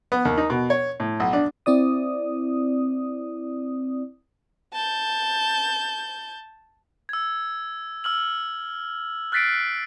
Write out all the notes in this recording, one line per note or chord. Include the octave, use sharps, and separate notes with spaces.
B3
D#2
D#4
B2
C#5
A2
B1
D4
C4 E4 D5 D#6
A5 G6
E6 G#6
E6 F6 F#7
F6 F#6 A6 B6 C7 D7